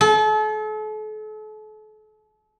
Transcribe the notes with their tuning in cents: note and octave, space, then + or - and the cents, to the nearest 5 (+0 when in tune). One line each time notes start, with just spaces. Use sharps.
A4 -40